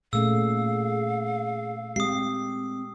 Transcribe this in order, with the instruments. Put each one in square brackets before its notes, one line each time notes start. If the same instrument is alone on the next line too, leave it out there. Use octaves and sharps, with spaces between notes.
[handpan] A#2 A3 C#4 [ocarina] G#4 [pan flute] F5 [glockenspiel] E6
[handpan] G#3 G4 [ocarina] C4 [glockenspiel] D#6 C7